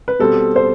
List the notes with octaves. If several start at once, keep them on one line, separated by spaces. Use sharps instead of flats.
B4
B2 G3 C4 A4
C5